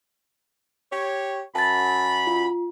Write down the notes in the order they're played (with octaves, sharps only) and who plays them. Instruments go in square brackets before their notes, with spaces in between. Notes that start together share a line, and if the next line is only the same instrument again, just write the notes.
[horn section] G4 C#5
[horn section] F#2 B5 [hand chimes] A5 A6
[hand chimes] F4